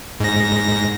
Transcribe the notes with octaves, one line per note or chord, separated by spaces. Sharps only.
G#2 A#6